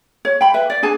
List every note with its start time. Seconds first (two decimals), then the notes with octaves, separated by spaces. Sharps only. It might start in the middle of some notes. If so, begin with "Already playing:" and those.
0.25 C#5
0.41 G5 B5
0.54 B4 E5
0.70 D5
0.82 D4 G#4 G#5 A5